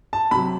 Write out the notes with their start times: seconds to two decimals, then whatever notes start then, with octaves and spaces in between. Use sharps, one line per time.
0.13 A5
0.31 C3 F#3 B5